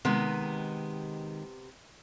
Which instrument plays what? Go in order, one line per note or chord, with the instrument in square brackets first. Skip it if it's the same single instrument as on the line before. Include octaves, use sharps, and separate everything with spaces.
[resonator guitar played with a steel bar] C3 B3 [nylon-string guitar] D#3 G#3